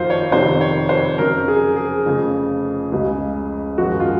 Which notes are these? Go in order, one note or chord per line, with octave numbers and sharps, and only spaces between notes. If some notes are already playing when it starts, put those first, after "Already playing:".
Already playing: F#1 F2 D#3 F#3 D#4 F4 C5
C#5
F2 C3 D#3 C5
C#5
C5
F2 C#3 F#3 A#4
G#4
G#4
F1 F2 C#3 F3
C#2 C#3 G#3
G#1 F#2 F3 G#3 F#4
F4